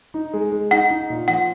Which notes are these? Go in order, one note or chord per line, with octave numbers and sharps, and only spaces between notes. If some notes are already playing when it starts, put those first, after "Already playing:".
D#4
G#3
G#3
D#4 F#5
D#4
A#2
F3 F#5